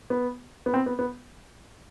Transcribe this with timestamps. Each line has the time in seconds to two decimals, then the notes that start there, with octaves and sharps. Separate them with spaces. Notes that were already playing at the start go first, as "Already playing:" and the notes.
0.10 B3
0.66 B3
0.74 C4
0.86 B3
0.99 B3